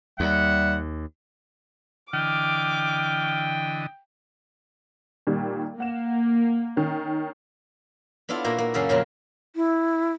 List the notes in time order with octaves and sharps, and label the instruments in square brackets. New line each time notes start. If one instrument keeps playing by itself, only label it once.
[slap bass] D#2 [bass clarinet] G3 [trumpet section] E5 F#5
[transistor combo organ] D3 E3 D#5 [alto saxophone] G5 [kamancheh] D6 [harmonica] F6
[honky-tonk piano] A#2 D#3 G3
[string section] A#3 [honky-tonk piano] F#5 E7
[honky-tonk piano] D#3 C#4
[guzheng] B3 D4 E4 F4 A4
A#2 A#3 E4 F#4
A#3
F#2 C#3 A#3 G#4 A4
F2 A#2 C#3 F#3 C4 F4
[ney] E4